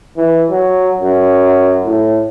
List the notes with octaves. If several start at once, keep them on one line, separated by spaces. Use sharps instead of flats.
E3
F#3
F#2
A2